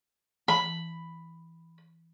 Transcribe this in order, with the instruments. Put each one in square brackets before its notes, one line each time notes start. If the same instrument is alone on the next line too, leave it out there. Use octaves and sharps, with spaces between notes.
[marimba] E3 [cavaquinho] B5